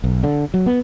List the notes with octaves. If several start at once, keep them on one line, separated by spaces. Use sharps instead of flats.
B1
D3
F#3
B3